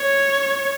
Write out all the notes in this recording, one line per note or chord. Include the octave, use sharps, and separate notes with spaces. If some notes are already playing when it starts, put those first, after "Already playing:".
Already playing: C#5